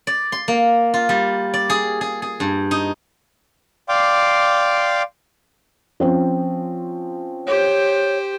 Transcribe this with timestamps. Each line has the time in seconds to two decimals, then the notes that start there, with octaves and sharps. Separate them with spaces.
0.07 D5
0.32 C6
0.48 A#3
0.94 F4
1.09 G3
1.54 D5
1.70 G#4
2.01 G#4
2.22 G#4
2.40 G2
2.71 D#4
3.89 D5 F5 G5 C6 D6
6.00 F3 C4 C#4
7.47 G4 C5 C#5